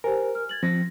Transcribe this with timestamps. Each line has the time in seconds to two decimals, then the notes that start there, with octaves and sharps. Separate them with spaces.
0.04 G4 A#4 C5 G#5
0.35 F6
0.49 G#6 A6 F#7
0.63 F3 C4 A#6